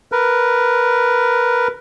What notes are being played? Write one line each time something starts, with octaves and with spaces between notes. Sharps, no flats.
A#4 B4